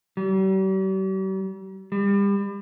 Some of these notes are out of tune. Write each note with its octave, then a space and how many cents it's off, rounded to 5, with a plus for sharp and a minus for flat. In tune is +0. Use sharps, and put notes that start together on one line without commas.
G3 -45
G3 +35